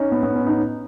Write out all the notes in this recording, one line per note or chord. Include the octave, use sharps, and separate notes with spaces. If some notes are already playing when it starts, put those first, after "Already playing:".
Already playing: C#4 D#4
B3
B3
C#4
D#4